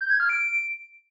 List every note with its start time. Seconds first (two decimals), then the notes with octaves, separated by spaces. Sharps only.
0.01 G6
0.10 G#6
0.20 F6
0.29 D7